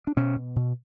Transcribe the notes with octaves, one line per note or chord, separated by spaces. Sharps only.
D4
B2 C#4
B2
B2